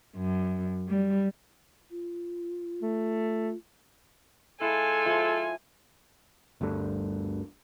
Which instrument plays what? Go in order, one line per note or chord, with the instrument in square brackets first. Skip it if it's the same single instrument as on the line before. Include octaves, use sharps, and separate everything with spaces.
[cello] F#2
G3
[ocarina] F4
[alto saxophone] A3
[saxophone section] G#3 F4 A4 [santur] E4 [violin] G#5
[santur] F3 E5
[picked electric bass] G1 D2 G2 D3